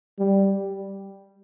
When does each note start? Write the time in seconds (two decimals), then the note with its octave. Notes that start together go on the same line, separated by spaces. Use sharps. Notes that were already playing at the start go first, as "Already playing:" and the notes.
0.19 G3